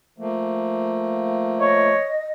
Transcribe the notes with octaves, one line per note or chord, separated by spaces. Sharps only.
F3 A3 A#3
C#5 D#5